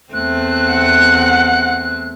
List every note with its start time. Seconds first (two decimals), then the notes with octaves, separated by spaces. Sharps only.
0.13 E2 A3 C4 F#6
0.70 F#5